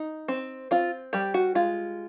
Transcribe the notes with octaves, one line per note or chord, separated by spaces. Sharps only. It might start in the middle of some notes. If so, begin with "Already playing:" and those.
Already playing: D#4
C4
C4 F4
G3 G4
F#4
G#3 F4